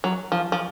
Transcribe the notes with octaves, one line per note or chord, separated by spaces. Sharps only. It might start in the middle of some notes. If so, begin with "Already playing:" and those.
F#3
F3
F3